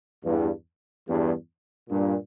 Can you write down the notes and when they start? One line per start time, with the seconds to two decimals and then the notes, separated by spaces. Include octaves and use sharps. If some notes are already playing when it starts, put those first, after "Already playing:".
0.24 E2 G2
1.07 E2 G2
1.90 G2 A#2